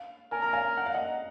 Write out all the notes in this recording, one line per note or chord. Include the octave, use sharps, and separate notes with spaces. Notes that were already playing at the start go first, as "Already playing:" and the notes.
Already playing: F5
A#4 G#5
A#5
F5 G#5
F#5
F5
D#5 F#5